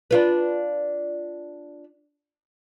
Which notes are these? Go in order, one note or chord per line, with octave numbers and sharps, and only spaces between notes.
D4 F4 B4